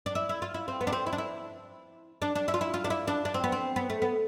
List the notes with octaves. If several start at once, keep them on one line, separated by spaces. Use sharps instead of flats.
D4
E4
E4
F4
E4
C4
B3
D4
C4
E4
D4
E4
D4
D4
E4
F4
E4
F4
D4
E4
D4
D4
C4
B3
C4
B3
A3
B3